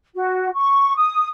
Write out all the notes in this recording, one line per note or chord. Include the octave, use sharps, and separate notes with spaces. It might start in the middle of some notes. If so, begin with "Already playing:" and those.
F#4
C#6
D#6